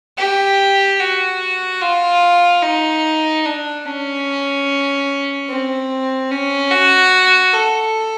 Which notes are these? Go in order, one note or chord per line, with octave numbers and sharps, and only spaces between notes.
G4
F#4
F4
D#4
D4
C#4
C4
C#4
F#4
A4